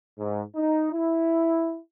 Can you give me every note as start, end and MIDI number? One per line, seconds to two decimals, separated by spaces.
0.18 0.42 44
0.55 0.89 63
0.92 1.77 64